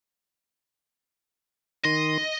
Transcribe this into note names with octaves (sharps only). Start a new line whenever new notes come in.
D#3 D#5 C6